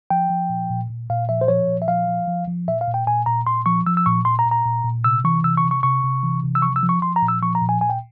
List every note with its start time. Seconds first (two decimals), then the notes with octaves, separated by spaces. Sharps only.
0.10 F3 G5
0.30 F3
0.49 A#2
0.70 A#2
0.90 A#2
1.10 A#2 F5
1.29 F3 E5
1.41 C5
1.48 F3 C#5
1.68 A#2
1.82 E5
1.88 F3 F5
2.08 F3
2.28 F3
2.47 F3
2.68 A#2 E5
2.81 F5
2.88 A#2
2.94 G5
3.07 A#2 G#5
3.26 A#2 A#5
3.47 A#2 C6
3.66 F3 C#6
3.86 F3 E6
3.97 E6
4.06 A#2 C#6
4.25 A#2 C6
4.39 A#5
4.46 A#2
4.51 A#5
4.65 A#2
4.85 A#2
5.04 C3 E6
5.24 E3 C#6
5.44 C3 E6
5.57 C#6
5.64 C3
5.71 C#6
5.83 C3 C#6
6.04 C3
6.23 E3
6.43 C3
6.55 E6
6.62 F3 C#6
6.76 E6
6.83 F3
6.89 C#6
7.02 F3 C6
7.16 A#5
7.22 A#2
7.28 E6
7.43 F3 C#6
7.55 A#5
7.62 A#2
7.69 G#5
7.81 A#2 G#5
7.90 G5